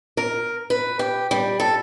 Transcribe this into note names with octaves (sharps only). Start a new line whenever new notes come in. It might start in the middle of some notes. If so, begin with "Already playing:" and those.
A#4
B4
G4
G3
A4